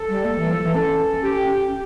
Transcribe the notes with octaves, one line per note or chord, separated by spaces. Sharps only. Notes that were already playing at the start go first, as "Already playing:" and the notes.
Already playing: A4
G3
A#3
E3
F3
E3
C#4 A4
G4